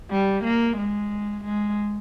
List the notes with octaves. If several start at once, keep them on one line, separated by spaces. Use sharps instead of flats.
G3
A#3
G#3
G#3